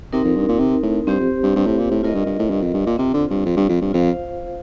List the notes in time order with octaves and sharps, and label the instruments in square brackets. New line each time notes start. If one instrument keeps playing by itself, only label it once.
[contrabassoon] C3 [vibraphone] C4 D#4 A#4
[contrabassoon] F2
G2
A#2
C3
A2
[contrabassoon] G2 [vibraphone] C4 G4 C5
[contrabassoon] F2
G2
G2
A2
A#2
A2
[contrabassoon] A2 [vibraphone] F4 A#4 D#5
[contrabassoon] G2
G2
A2
G2
F2
G2
A#2
[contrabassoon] C3 [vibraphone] C4 F4 C5
[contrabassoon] D3
G2
F2
G2
F2
G2
[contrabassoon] F2 [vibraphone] F4 C5 F5